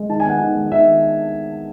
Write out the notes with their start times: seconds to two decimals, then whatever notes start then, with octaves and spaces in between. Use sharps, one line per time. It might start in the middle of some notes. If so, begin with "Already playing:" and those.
Already playing: G#3
0.09 D#3 A5
0.20 G#5
0.25 B3 F#5
0.41 D#3
0.56 G#3
0.72 D#3 E5